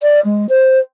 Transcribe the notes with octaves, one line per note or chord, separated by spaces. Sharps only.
D5
G#3
C5